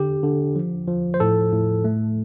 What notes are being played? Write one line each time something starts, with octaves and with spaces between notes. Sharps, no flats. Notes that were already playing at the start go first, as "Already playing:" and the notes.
Already playing: D3 G4
D3
F3
F3
C5
A2 A4
A2
A3